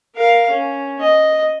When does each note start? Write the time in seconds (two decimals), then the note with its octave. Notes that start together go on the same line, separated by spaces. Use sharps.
0.16 A#4 F5
0.50 C#4
1.01 D#5